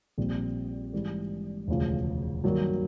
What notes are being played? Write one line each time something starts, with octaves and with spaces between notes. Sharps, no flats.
A#1 A#2 G3 C4
G#2 E3 G3
E1 D2 C#3 F3
G2 D#3 F#3 A#3